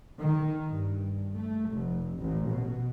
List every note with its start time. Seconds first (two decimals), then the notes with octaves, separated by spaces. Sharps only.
0.20 D#3
0.67 G2
1.34 A3
1.70 F1
2.17 A1
2.48 B2